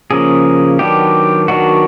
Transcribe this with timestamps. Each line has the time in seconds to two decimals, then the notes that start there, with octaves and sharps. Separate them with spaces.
0.11 C#3 F3 A#3 C#4 G#4
0.79 D#3 F#3 B3 D4 G4
1.48 D#3 F#3 B3 D4 F#4